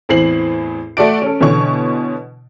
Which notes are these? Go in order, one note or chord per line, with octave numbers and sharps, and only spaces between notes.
E2 A2 C4 C7 F#7
A3 F#4 A4 D5 D7
C#4 A4
B2 D3 E3 C#5 C#6